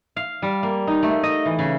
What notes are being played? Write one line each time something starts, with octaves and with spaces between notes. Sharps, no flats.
F5
G3
A#3
D#4
A3
D#5
E3
C#3